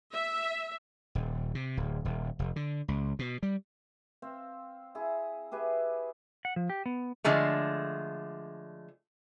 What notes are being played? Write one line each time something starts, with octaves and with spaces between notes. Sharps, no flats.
E5
D#1
C3
D1
D#1
F1
D3
C#2
B2
G3
C4 F5
E4 G#4
G4 G#4 B4 E5
F#5
F3
G4
B3
D3 F3 G#3 A3